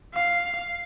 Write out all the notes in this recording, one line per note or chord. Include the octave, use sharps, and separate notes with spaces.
F5